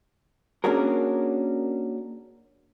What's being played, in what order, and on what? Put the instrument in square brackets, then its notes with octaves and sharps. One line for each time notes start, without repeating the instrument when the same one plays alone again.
[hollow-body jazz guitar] A#3 C#4 D4 F#4 G#4 A#4